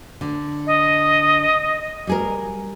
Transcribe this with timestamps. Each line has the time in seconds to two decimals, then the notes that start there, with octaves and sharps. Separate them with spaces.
0.21 D3
0.67 D#5
2.07 G3 G#4 A#4